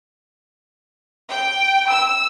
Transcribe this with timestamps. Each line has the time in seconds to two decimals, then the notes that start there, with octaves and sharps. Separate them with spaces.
1.30 G5
1.89 E6